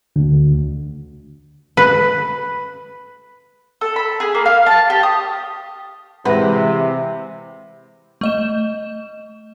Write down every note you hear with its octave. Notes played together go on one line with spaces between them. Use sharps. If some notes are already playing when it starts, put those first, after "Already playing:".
D2
B4
A4
B5
G#4
A#3
F5
A5
G4
D#6
C3 E3 G#3 B4 E5 F#5 A#6
A3 D#5 E7